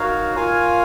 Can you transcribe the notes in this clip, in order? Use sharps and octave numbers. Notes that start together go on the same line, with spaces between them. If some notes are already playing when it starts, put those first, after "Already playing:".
Already playing: D#4 F#4 A#4 C#5 F5
F4 A#4 C#5 F5 G#5